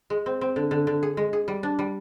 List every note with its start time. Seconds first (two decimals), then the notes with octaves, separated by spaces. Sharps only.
0.10 G#3
0.26 C4
0.41 C4
0.56 D3
0.71 D3
0.87 D3
1.03 G#4
1.17 G#3
1.33 G#4
1.48 G3
1.63 D4
1.79 G3